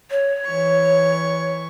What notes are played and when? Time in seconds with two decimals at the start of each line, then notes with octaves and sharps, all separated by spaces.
0.11 C#5
0.46 E3 C#6